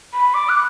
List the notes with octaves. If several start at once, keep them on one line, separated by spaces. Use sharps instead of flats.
B5
D6
F#6